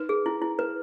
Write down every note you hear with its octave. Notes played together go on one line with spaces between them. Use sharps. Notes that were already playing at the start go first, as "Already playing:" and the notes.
Already playing: D#4 B4
G#4
E4
E4
B4